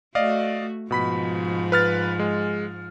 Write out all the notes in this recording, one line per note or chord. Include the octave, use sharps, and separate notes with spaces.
A3 F#4 D5 D#5 F5
G#2 B2 F3 B5 B6
B4 F6 A6
G#3